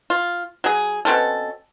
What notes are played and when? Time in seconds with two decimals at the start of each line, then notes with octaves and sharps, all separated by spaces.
0.10 F4
0.64 F#3 G#4
1.05 B2 C4 C#4 A4